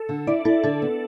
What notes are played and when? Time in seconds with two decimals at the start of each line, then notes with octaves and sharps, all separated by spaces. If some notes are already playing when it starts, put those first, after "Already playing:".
Already playing: A4
0.09 D3
0.27 E4 D5
0.45 E4 A4
0.64 D3 A4
0.82 B3